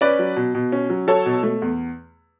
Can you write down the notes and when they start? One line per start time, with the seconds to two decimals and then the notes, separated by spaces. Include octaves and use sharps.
0.01 C#4 B4 D5
0.19 F#3
0.36 B2
0.55 B2
0.72 C#4
0.90 F#3
1.07 F#3 A4 C#5
1.26 B2
1.43 A3
1.62 E2